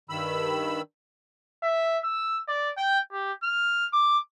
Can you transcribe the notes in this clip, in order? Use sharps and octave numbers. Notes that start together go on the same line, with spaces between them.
G2 D#3 B5 E6
E5
E6
D5
G5
G4
F6
D6